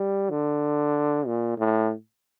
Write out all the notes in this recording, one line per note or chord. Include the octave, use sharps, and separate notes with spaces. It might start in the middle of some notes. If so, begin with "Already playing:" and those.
Already playing: G3
D3
A#2
A2